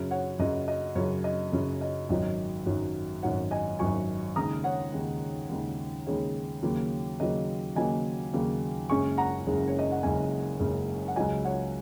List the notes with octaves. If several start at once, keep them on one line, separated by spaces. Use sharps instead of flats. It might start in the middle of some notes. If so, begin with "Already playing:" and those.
Already playing: F#2 C#3 F#3
C#5 F#5
F#2 C#3 F#3 D#5
D#5
F#2 C#3 F#3 C#5
D#5
F#2 C#3 F#3
D#5
G#1 F#2 F#3 D#4 D#5
G#1 F#2 F#3 D#4
G#1 F#2 F#3 D#4 C#5 F#5
D#5 G#5
G#1 F#2 F#3 D#4 G#5 C#6
D#2 C#3 G#3 D#4 A#5 D#6
C#5 F#5
D#2 C#3 G#3 D#4
D#2 C#3 G#3 D#4
D#2 C#3 G#3 D#4 C#5
D#2 C#3 F#3 A#3
D#2 C#3 F#3 A#3 D#5
D#2 C#3 F#3 A#3 D#5 G#5
D#2 C#3 F#3 A#3
F#1 F#2 C#3 G#3 C#4 G#5 C#6
F#5 A#5
F#1 F#2 C#3 G#3 C#4
C#5
D#5
F#5
F#1 F#2 C#3 G#3 C#4 D#5 G#5
F#1 F#2 C#3 G#3 C#4
F#5
C#2 C#3 F#3 D#5 G#5
C#5 F#5